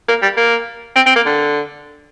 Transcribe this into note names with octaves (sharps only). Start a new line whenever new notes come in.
A#3
G3
A#3
C4
C4
A#3
D3